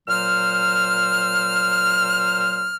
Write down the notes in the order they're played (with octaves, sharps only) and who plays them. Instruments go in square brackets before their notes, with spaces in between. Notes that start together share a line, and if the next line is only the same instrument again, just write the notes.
[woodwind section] A#2 F#3 C5 F6